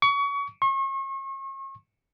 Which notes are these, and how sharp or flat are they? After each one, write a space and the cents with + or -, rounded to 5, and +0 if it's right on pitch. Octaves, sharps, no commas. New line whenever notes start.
C#6 +30
C#6 -40